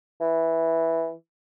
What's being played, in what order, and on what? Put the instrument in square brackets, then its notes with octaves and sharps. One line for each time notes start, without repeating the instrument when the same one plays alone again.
[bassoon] E3